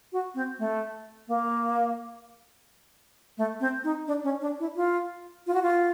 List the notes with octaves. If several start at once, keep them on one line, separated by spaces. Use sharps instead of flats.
F#4
C4
A3
A#3
A3
C4
D#4
D4
C#4
D4
E4
F4
F4
F#4
F4